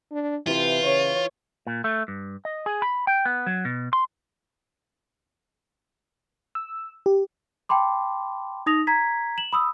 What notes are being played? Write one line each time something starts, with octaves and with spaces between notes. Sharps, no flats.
D4
C3 E3 F4 C5
C#3 C#5
A#2
A3
G2
D#5
G#4
B5
G5
B3
F#3
B2
C6
E6
G4
G5 A5 B5 C6 D6
D#4 D#6 A#6 F7
A#5 G#6 B6
E7 F#7
B5 D#6 E6